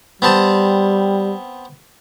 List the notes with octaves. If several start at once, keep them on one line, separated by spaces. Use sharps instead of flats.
G3 B3 C4 A5